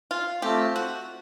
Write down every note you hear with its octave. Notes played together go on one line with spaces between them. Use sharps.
F4
A3 C4 F4 G4
F#4